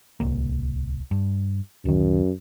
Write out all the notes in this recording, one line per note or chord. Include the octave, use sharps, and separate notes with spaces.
D1 C2 A#3
G2
D1 F#2 D#3